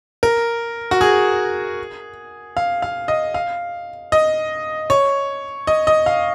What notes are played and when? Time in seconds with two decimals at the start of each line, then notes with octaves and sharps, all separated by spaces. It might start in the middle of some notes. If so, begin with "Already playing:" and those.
0.23 A#4
0.91 F#4
1.01 G#4
2.57 F5
2.82 F5
3.08 D#5
3.34 F5
4.12 D#5
4.90 C#5
5.67 D#5
5.87 D#5
6.06 F5